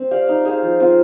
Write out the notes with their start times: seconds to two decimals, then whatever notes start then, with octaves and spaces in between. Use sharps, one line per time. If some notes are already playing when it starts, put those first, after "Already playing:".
Already playing: C4
0.11 G4 D5 F5
0.29 D#4
0.45 G#4 C5 F5
0.62 F3
0.80 C4 F4